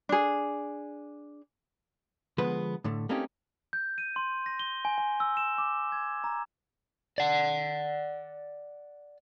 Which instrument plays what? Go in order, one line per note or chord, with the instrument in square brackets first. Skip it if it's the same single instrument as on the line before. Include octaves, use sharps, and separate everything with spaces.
[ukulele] D4 G#4
[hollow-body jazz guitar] D3 F3 G#3 B3 B4
A2 D3 A3
A3 A#3 C4 C#4 D#4 G4
[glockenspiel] G6
D#7
C6
A#6
G7
G#5
G#5
E6
E7
D6
G#6
A#5
[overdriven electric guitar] D5 F#5